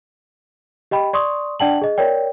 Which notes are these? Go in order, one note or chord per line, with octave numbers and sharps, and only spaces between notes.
G4 D#5 G5 B5
D5 C6 C#6 D#6
D4 D5 F#5 G5 A5 F#7
G#4 D#5
A#4 C#5 D5 G5